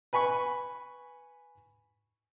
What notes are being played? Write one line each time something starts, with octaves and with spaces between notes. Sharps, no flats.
B4 G#5 B5 C#6